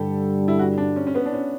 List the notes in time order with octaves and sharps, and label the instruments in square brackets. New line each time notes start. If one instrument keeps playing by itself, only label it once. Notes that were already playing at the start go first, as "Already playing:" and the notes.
Already playing: [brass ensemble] G2 D3 G3 [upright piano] G4 A4
[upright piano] E4
F#4
D4
C#4
C#4
B3
D4
C#4